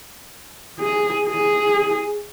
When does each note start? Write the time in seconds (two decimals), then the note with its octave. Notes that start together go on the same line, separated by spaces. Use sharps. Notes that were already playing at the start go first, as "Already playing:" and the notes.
0.80 G#4
1.28 G#4